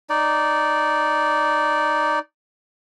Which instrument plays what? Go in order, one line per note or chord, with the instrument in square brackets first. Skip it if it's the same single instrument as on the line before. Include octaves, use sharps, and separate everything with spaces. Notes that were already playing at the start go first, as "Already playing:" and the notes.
[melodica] D#4 D5